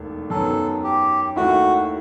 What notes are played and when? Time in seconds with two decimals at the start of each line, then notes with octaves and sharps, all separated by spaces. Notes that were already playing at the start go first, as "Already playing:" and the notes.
Already playing: E1 D#2 D#3 A3
0.30 F#2 D#3 F#3 B3 A4
0.84 G4
1.36 D#2 D#3 A3 E4 F#4